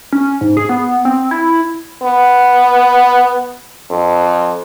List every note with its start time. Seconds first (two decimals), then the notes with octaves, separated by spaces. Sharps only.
0.13 C#4
0.41 G#2
0.57 G#4
0.69 B3
1.05 C4
1.31 E4
2.02 B3
3.90 F2